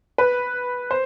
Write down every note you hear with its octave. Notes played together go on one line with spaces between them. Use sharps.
B4
C5